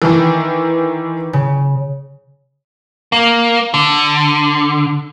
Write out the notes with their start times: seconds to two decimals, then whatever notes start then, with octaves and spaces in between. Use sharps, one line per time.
0.02 D#3 E3
1.33 C#3
3.12 A#3
3.74 D3